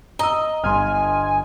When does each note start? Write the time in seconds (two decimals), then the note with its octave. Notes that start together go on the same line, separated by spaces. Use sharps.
0.19 D#5 A#5 E6
0.64 G1 G2 G#5 C6 F6